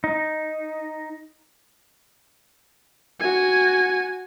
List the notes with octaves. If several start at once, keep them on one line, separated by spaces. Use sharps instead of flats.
D#4
F#4 G#5